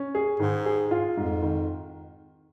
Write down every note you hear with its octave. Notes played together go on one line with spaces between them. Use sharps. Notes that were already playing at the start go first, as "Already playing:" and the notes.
Already playing: C#4
G#4
G#2 D#3
G#4
F4
F2 G#2
D#3